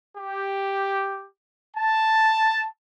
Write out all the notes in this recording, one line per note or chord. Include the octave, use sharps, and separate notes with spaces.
G4
A5